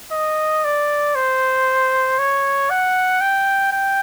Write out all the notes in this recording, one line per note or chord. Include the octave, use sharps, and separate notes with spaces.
D#5
D5
C5
C#5
F#5
G5
G5